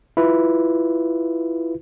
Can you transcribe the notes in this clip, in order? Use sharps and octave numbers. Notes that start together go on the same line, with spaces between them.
E4 F4 B4